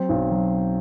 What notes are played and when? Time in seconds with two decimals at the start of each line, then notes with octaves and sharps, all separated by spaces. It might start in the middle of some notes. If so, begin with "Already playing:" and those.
Already playing: F#3 C4 C5
0.09 B1
0.31 F#3